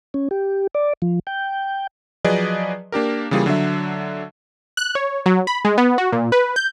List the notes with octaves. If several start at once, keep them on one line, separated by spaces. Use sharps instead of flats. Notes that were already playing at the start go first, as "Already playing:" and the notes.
C#4
G4
D5
F3
G5
F3 F#3 G#4 B4 D5 D#5
A#3 D4 G4 A#4
C#3 E3 G3 A#3 F4 G#4
D3 F#3 D4 E5
F#6
C#5
F#3
B5
G#3
B3
F#4
A#2
B4
G6